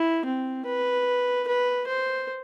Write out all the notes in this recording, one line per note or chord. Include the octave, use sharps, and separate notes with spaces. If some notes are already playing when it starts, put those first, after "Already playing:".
Already playing: E4
C4
B4
B4
C5